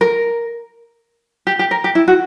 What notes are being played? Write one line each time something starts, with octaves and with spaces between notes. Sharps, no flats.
A#4
G4
G4
A#4
G4
E4
F#4